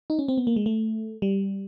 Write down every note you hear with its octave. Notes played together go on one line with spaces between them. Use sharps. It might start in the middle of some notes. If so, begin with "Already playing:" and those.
D#4
C#4
C4
B3
A#3
G#3
A3
G3